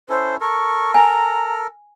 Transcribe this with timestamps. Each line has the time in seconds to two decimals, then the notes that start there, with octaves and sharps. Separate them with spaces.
0.09 C#4 E4 A4 C5
0.41 A4 A#4 C#6
0.94 G#5 A#5